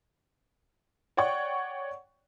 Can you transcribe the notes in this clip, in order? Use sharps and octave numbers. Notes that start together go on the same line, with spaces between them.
C#5 D5 F#5 G5 C#6